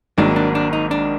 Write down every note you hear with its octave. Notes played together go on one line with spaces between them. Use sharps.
G#1 G#2 D#3 F#3 A#3 D4
D4
D4
D#4
D4